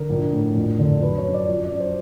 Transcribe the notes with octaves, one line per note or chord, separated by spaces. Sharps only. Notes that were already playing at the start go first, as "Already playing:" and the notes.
Already playing: D3 A#4
A#1
A2
F2
D3
F#3 B4
C#5
F#2
D5
F3
D5
F#2
C5